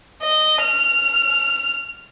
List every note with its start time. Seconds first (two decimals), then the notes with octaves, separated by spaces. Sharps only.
0.23 D#5
0.63 F6